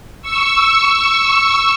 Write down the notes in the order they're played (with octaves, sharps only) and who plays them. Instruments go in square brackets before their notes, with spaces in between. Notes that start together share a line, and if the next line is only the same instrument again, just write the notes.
[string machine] C#6 E6